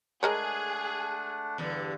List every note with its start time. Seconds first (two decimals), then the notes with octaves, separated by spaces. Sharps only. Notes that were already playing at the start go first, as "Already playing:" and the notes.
0.23 G#3 A3 D4 G#4 A#4 C#5 F#5
1.58 E2 G2 D3